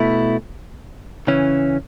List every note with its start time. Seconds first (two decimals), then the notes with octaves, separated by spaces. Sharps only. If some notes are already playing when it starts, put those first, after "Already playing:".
Already playing: B2 A3 E4
1.27 C#3 E3 C#4